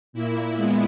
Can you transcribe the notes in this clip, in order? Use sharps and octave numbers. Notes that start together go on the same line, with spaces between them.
A#2 A#3 E4
A#2 G#3 B3